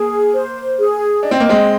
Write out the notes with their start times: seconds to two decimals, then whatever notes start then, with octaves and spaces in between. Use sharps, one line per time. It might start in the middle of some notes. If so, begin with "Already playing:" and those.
Already playing: A#3 G#4
0.34 C5
0.78 G#4
1.23 D4 D#5
1.31 C4
1.40 A#3
1.49 G#3 C4